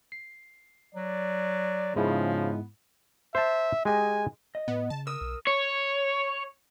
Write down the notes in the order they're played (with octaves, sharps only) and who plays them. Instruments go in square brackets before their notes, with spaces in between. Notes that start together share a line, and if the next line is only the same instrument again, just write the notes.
[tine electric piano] C7
[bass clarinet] F#3 [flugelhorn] D5
[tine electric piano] G#2 G#3 E4 [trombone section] C#3 [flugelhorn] F3 [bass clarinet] B3
[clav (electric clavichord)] C5 A5 [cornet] E5
[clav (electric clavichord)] G#3 G4 D#5 [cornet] G#5
[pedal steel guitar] D#5
[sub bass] A2 [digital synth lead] B3
[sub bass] C#3 [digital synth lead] A5
[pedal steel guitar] A#4 D#6 [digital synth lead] E6
[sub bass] B1
[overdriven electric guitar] C#5